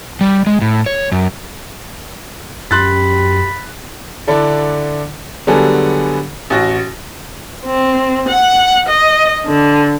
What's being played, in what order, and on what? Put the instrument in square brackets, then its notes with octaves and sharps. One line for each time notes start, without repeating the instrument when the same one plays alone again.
[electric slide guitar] G3
G#3
A2
C#5
F#2
[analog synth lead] F#2 [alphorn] G4 [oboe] B5 [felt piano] C6 F#6 A6
[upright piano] D3 D4 E4 A4
D3 F#3 G3 B3 G#4 A4
A1 F#4 A#6
[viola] C4
F#5
D#5
D3